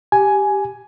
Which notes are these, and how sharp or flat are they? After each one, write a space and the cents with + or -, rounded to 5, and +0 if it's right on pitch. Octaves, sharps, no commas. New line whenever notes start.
G4 +0 G#5 +10